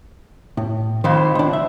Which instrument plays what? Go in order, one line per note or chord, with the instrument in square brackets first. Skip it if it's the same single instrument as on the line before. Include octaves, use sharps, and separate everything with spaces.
[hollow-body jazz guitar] A2
[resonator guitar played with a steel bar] F2 A2 C5 [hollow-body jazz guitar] D#3
[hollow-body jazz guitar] C#2 D4
E5